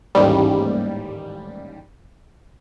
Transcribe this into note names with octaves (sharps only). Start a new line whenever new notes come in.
A1 D#2 G#2 G3